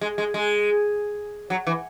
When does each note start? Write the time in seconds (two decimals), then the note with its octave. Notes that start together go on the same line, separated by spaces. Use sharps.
0.01 G#3
0.18 G#3
0.34 G#3
1.50 F#3
1.67 E3